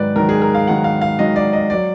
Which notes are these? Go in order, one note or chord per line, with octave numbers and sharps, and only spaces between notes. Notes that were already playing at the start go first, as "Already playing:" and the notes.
Already playing: G#2 D#3 F#3 B4 D5
G#2 D#3 F#3 A#4
G#4
A#4
F5
G#2 D#3 F#3 F#5
F5
F5
G#2 D#3 F#3 D#5
D5
D#5
F#3 D5